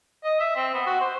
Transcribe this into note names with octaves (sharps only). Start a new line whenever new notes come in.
D#5
E5
C4
B3
F#4
C5